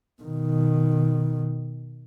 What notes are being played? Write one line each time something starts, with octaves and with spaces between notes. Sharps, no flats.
B2 D#3